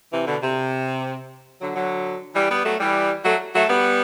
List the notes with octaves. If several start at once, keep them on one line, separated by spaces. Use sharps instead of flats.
C3 E3
B2 D3
C3
D3 F#3
D3 F#3
E3 G3
G3 B3
F#3 A3
E3 G3
F#3 A3
F#3 A3
G3 B3